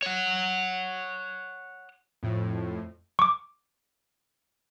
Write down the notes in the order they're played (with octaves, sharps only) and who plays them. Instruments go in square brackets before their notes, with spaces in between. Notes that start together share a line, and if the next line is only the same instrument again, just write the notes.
[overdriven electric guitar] C#5 F#5
[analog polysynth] F2 A2
[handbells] C#6 D6